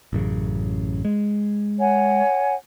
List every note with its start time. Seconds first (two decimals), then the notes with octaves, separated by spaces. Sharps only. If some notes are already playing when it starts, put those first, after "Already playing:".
0.13 A1 F#2 C#3
1.05 G#3
1.80 C#5 F#5 G#5